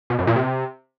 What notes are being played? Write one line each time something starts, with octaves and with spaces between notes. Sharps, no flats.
B2
F#2
A#2
C3